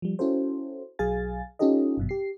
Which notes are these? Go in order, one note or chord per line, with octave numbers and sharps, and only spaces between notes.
F3 G3
C#4 E4 F#4 A4 C5
B1 F#3 G#4 F5 G#5 A6
C#4 D#4 F4 G4 A4 D#5
G1 F#2 B2
G4 C7